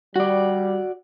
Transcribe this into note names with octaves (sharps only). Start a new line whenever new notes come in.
G3 F#4 D5